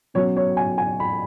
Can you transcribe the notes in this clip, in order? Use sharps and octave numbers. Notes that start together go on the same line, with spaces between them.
B2 F#3 C#4 C#5
C#5
G#5
G#5
B5